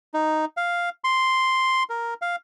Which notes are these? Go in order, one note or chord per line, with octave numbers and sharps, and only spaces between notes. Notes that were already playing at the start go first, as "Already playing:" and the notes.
D#4
F5
C6
A#4
F5